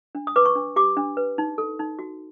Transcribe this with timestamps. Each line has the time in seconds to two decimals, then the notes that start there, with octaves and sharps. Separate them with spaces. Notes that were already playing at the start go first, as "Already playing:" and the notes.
0.15 D4
0.27 D#6
0.36 B4 D6
0.45 C#6
0.55 D4
0.76 G4 D6
0.97 D4
1.17 B4
1.38 D#4
1.58 A4
1.79 D#4
1.99 F#4